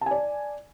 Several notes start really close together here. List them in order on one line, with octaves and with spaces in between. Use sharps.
A5 G#5 D5